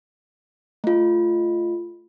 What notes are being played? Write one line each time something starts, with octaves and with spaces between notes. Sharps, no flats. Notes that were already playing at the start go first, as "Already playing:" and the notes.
A3 F4